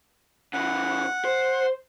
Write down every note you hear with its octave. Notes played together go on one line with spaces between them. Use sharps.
C#3 E3 F#5
C5